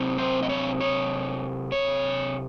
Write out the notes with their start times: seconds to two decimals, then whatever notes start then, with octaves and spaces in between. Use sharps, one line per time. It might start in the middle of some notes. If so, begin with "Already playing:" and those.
Already playing: C3 F#3 C4
0.18 C5
0.42 D#5
0.49 C#5
0.81 C#5
1.72 C#5